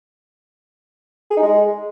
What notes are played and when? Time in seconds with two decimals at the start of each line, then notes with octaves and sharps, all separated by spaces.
1.31 G#4
1.37 D#4
1.43 G#3